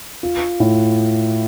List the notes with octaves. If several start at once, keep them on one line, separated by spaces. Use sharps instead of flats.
F4
A2